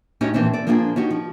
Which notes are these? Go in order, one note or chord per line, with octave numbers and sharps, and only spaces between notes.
A2 C#4 D#4 F#4 G4
A#2 E3 F3 C4 C#4
A4 D5
F3 A#3 D4 F4 G#4
C#4 D#4 F#4 G4
F3